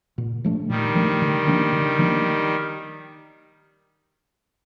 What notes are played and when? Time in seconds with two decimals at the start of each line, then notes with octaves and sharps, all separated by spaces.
0.18 A#2
0.44 F3 A3 D4
0.69 A#2 D#3 G3
0.95 F3 A3 D4
1.22 D3
1.48 F3 A#3 D4
1.72 D3
1.99 F3 A#3 D4